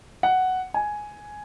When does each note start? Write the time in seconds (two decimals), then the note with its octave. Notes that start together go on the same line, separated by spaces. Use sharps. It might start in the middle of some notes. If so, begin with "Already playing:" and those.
0.23 F#5
0.74 G#5